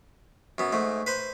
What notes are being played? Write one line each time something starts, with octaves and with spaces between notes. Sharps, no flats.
F#2 B3
G#2 A3
B4 C5 C6